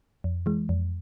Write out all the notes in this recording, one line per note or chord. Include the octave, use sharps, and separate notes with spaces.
F2
E3 G#3
F2